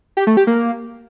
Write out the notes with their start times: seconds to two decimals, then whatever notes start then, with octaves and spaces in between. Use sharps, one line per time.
0.17 G4
0.27 A3
0.37 G4
0.47 A#3